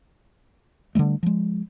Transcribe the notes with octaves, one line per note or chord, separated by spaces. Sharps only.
D3 E3 G3 A3
F3 G#3